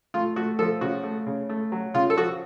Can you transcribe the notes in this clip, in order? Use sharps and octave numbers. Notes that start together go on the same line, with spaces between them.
A3 F4
A3 F#4
F3 A4
C#3 F#4
A3
C#3
A3
F#3
C#3 F4
A4
F3 F#4